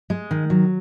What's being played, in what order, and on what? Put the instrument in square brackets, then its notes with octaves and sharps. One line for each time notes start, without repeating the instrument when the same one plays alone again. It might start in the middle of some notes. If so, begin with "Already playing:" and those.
[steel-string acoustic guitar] G#3
D#3
F#3